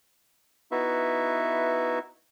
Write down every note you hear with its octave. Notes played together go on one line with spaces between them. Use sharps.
B3 D#4 E4 F#4 B4 E5